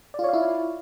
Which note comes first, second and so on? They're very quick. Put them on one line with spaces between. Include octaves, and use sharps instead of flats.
D5 F4 C#5 F5 E4